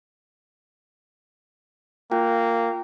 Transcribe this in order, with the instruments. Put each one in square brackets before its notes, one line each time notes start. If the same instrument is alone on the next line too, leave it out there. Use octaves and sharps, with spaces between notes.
[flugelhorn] A#3 [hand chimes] F4 G5